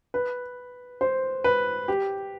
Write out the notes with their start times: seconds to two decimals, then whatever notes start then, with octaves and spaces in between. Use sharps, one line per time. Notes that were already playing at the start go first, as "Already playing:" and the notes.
0.14 B4
1.01 C5
1.44 B4
1.88 G4